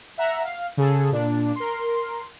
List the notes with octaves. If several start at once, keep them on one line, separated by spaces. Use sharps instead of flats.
E5 F#5 A#5
F5
C#3 G#4 A4
A#2 D4
A#4 C6